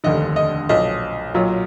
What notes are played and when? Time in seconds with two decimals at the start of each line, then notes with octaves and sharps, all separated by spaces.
0.04 F1 D#2 D3 D#5
0.36 D#5
0.69 B1 A#2 F3 D#5
1.34 B1 A#2 F#3